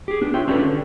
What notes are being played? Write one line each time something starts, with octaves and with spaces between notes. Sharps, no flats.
G4 G#4
B3 D4
F4 C#5 E5 G5
C#4 D4 F4 G4 A4 B4
D3